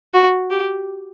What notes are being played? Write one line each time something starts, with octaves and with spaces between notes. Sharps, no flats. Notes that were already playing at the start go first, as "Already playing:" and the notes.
F#4
G4